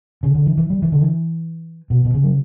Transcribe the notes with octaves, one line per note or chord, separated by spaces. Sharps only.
C#3
D3
E3
E3
G3
E3
D3
E3
B2
B2
C#3
F#3